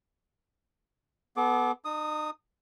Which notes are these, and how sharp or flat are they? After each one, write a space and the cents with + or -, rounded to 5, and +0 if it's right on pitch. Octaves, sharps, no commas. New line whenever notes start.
B3 +0 A4 -40 D6 +0
D#4 -40 D#6 +0